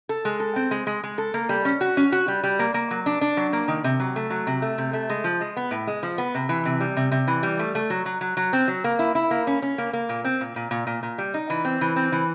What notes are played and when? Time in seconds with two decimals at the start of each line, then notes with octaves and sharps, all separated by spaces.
0.09 A4
0.25 G#3
0.40 A4
0.56 C4
0.71 G#3
0.87 G#3
1.04 G#3
1.18 A4
1.34 A#3
1.49 G3
1.65 C#4
1.81 F#4
1.97 C#4
2.12 F#4
2.28 G3
2.43 G3
2.59 A#3
2.74 A#3
2.91 F#3
3.06 D4
3.21 D4
3.37 F#3
3.53 A#3
3.68 D#3
3.84 C3
4.00 F#3
4.16 A3
4.30 F#3
4.47 C3
4.62 A3
4.78 C3
4.93 A3
5.10 G#3
5.24 F3
5.41 G#3
5.57 B3
5.71 A2
5.87 G#3
6.03 F3
6.18 B3
6.35 C3
6.49 E3
6.65 C3
6.80 G3
6.97 C3
7.12 C3
7.27 E3
7.43 G3
7.59 A3
7.75 A3
7.90 F#3
8.06 F#3
8.21 F#3
8.37 F#3
8.53 C4
8.68 F#3
8.84 A#3
8.99 E4
9.15 E4
9.31 A#3
9.47 C#4
9.62 C#4
9.78 A#3
9.93 A#3
10.09 A#2
10.24 C4
10.41 A#2
10.56 A#2
10.71 A#2
10.87 A#2
11.03 A#2
11.18 G3
11.34 D#4
11.50 E3
11.65 C4
11.81 E3
11.96 C4
12.12 E3